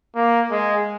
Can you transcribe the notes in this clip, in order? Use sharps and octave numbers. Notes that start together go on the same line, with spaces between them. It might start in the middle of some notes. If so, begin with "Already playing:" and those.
A#3
G#3